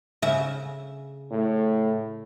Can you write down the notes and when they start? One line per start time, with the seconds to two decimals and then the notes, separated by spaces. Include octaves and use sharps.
0.22 C#3 E5
1.31 A2